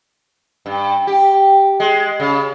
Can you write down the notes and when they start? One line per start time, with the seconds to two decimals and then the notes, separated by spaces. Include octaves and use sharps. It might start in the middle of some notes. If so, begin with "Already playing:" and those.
0.66 G2
1.07 G4
1.80 G#3
2.20 C#3